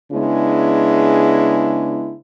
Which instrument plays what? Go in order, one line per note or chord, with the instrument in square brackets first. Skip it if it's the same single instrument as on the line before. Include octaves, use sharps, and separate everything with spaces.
[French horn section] C#3 G#3 B3 D4 E4